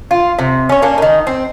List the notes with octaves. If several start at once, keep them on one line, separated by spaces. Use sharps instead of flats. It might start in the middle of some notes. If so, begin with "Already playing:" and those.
F4
C3
C#4 C#5
A#3 C#4 D4
D#3 D#4
C4